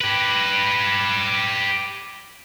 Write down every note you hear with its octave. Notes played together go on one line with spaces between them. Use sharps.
G4 B4